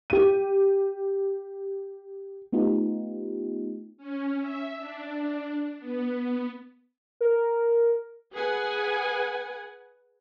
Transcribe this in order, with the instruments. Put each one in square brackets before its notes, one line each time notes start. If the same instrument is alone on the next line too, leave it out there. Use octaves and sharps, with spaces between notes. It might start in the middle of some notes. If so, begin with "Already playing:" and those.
[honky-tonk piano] G4 D#7
[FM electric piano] A3 B3 D#4 F4 G4
[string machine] C#4
E5
D4
B3
[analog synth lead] A#4
[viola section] G#4 B4 F#5 G#5